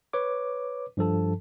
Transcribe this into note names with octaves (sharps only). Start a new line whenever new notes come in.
B4 C#5 D6
G2 F3 A4 A5